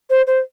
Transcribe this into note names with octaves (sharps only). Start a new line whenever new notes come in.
C5
C5